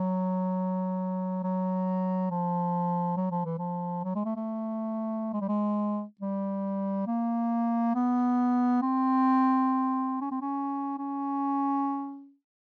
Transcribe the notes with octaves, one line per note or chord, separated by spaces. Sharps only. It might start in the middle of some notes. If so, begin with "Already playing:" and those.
Already playing: F#3
F#3
F3
F#3
F3
E3
F3
F#3
G#3
A3
A3
G#3
G3
G#3
G3
A#3
B3
C4
C#4
C4
C#4
C#4